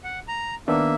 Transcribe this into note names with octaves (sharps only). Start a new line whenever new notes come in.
F#5
A#5
D#3 A#3 B3 D4 E5